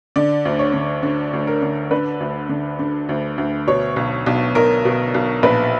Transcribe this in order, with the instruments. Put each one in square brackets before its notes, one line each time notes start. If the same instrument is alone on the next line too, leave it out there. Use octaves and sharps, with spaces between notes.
[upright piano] D3 D5
D2
C#5
D3
D3
D2
A#4
D3
D3 B4
D2
D3
D3
D2
D2
B2 C#5
B1
B1
B1 A#4
B2
B1
A#1 B4